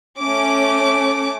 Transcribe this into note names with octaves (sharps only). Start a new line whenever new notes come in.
A3 C#4 D6